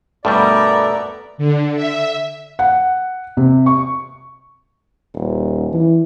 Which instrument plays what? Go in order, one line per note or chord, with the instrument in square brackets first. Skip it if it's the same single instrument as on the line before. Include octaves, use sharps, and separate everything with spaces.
[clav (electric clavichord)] G2 B2 G3 [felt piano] A3 A4 [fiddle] B3 A#4 [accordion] D5
[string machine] D3
E5
[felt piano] F#5
C3
C#6
[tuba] D#1
E3